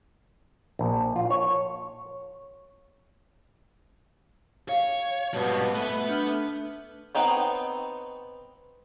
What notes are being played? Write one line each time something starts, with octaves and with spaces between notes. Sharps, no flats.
A#1
F4
C#5
C#5 F5
G#2 B2 G3 A5
A3 B3 B4
D4 F6 G6
B3 C4 D#4 C#5